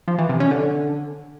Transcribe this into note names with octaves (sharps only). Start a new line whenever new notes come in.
F3
E3
C3
C#4
D3